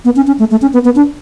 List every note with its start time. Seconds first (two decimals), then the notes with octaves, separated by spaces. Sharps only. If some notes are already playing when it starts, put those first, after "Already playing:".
0.05 B3
0.16 C#4
0.27 C#4
0.39 A3
0.51 A3
0.62 C#4
0.73 B3
0.85 B3
0.96 D4